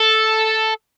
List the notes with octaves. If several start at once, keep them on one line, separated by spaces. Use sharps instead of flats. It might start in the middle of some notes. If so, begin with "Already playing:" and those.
Already playing: A4